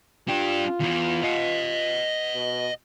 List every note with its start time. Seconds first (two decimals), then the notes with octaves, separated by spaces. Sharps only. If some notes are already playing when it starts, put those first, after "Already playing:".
0.28 D4 F4 G4
0.80 E2 E3
1.23 D#5 F#5
2.35 B2